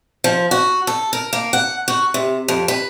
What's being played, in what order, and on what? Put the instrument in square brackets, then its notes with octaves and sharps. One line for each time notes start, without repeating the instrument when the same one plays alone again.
[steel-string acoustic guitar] F3
F#4
A4
A#4
A#3
F#5
F#4
C3
F2
B4